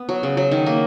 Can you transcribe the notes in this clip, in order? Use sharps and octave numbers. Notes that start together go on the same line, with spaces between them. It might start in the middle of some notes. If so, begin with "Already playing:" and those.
Already playing: B3
F#3
C#3
F#3
D#3
A#3